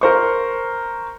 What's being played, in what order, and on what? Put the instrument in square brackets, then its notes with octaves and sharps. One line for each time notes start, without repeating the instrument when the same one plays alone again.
[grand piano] A#4 C5 C#6